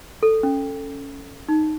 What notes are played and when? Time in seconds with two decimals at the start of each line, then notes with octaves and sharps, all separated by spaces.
0.23 A4
0.43 C#4
1.49 D#4